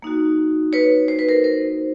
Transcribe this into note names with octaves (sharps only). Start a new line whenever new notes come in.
A#3 D#4 F#4
B4 C#5
C5
B4
A#4 C5
A#4 C5